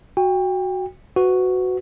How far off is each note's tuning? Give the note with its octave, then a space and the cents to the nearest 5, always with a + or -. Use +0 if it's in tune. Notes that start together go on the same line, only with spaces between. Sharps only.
F#4 +0 G5 +25
F#4 +0 B4 +25